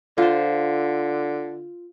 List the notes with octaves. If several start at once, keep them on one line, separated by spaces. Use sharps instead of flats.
D3 F4 C5